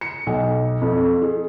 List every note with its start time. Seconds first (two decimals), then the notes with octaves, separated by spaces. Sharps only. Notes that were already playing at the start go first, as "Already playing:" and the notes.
0.01 C#7
0.27 B1
0.81 F2
1.22 G#4